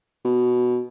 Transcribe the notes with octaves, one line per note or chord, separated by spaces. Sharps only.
B2